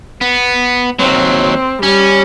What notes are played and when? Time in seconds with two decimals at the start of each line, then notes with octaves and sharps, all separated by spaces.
0.21 B3
0.99 D#2 F#3 C4
1.83 G3 C#4